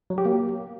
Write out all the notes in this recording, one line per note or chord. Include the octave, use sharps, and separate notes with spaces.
F#3
G4
A#3